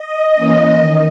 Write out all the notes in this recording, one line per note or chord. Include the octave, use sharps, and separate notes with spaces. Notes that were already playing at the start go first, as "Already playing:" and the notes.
Already playing: D#5
E3 A#3 C#4
D#3